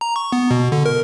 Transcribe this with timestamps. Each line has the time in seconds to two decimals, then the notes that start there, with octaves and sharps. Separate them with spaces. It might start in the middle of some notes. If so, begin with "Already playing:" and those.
0.01 A#5
0.16 C#6
0.32 B3
0.51 B2
0.72 D3
0.86 A#4